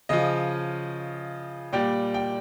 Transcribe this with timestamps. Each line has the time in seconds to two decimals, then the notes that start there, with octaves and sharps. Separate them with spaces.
0.09 C#3 F3 D#5
1.73 A#2 G3 G5
2.14 G5